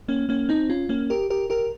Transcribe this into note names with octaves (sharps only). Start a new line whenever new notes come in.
A#3 C#4
A#3 C#4
C4 D#4
C#4 F4
A#3 C#4
G4 A#4
G4 A#4
G4 A#4